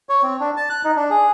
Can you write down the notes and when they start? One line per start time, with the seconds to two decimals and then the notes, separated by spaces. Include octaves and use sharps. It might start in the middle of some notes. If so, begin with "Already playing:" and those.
0.09 C#5
0.23 C4
0.40 D4
0.57 A5
0.70 F#6
0.84 D#4
0.96 D4
1.10 G#4